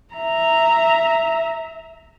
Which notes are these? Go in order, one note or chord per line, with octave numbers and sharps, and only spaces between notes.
E5 A#5